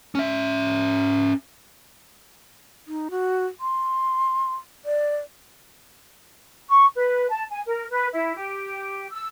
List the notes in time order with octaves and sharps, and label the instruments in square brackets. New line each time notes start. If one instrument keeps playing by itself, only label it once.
[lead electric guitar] C#4 E5
[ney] D#4
F#4
C6
D5
[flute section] C#6
B4
A5
G#5
A#4
B4
E4
G4
E6